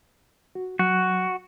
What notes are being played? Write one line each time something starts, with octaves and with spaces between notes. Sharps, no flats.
F#4
F#3 F#4